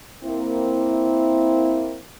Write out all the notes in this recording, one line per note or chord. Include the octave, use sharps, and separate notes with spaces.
A#3 C4 E4